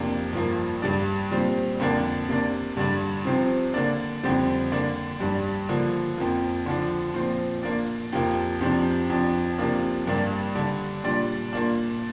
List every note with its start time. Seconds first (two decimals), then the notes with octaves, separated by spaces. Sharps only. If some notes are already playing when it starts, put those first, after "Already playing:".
Already playing: F2 C3 A#3 D4
0.33 G2 F3 A#3
0.82 G2 G3 D4
1.31 A#2 G3 C4
1.79 F2 D3 A#3 D4
2.29 C3 A#3 D4
2.77 G2 D3 G3 D4
3.25 C3 F3 C4
3.74 D3 A#3 D4
4.23 F2 D3 G3 C4
4.72 D3 A#3 D4
5.20 G2 G3 D4
5.69 D3 F3 A#3
6.18 F2 F3 A#3
6.66 D3 F3 D4
7.14 A#2 F3 C4
7.63 A#2 A#3 D4
8.13 F2 C3 F3 A#3
8.61 F2 C3 F3 D4
9.10 F2 F3 D4
9.58 C3 F3 A#3 D4
10.07 G2 G3 A#3 D4
10.55 D3 G3 D4
11.04 A#2 G3 D4
11.53 A#2 A#3 D4